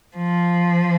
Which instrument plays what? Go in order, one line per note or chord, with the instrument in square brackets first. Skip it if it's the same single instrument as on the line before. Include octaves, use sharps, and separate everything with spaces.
[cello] F3